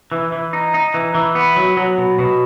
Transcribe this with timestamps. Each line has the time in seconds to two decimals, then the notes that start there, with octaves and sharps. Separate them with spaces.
0.12 E3
0.32 E3
0.53 D#4
0.74 D#4
0.94 E3
1.15 E3
1.35 B3
1.56 F#3
1.77 F#3
1.98 B2
2.19 B2